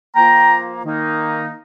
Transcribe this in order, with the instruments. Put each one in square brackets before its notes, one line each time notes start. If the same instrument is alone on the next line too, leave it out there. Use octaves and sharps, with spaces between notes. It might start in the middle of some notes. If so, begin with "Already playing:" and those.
[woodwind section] F3 A#3 F4 G5 A#5
D#3 A#3 D#4